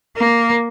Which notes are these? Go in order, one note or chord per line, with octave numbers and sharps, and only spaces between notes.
A#3